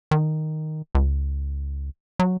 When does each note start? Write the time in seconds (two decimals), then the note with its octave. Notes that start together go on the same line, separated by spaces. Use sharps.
0.11 D#3
0.95 C#2
2.19 F#3